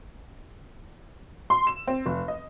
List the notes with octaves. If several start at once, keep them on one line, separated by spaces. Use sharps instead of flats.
C6
E7
C4
F1
D#5